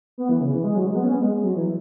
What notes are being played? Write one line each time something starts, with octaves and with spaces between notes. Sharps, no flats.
B3
E3
C#3
E3
G#3
F#3
G#3
B3
C#4
B3
G#3
G#3
F#3
E3